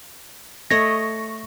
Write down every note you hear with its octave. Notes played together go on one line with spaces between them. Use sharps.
A3 C#5 D#5 A#6